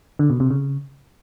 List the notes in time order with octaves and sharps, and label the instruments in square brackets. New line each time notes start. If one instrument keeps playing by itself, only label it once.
[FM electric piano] D3
B2
C3
C#3